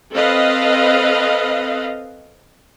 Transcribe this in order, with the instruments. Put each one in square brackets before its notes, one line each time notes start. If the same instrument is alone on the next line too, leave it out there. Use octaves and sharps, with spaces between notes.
[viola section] C4 A4 B4 D#5 F5